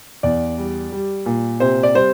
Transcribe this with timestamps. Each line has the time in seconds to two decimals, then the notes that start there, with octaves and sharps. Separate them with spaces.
0.23 E2 D5
0.58 G3
0.92 G3
1.26 A#2
1.60 C3 C5
1.83 D5
1.94 G3 C5